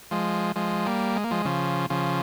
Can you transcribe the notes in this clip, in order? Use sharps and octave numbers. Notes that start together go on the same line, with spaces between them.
F3 G#3
F3 G#3
G3 A#3
G#3
A#3
F3 G#3
C#3 F3
C#3 F3